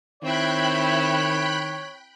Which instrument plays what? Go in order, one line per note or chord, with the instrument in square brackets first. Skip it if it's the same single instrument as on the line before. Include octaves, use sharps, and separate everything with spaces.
[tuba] D#3 [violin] C4 E4 [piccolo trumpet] C#5 [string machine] G5 B5 F#6